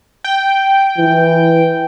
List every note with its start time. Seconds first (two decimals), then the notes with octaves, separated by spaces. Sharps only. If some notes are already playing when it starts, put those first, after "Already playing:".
0.24 G5
0.98 E3